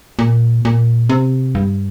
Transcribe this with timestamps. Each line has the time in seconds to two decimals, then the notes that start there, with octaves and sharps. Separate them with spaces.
0.19 A#2
0.65 A#2
1.10 C3
1.55 G2